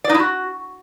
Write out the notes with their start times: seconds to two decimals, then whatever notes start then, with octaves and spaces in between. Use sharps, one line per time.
0.04 D5
0.09 D#4
0.14 E4
0.19 F#4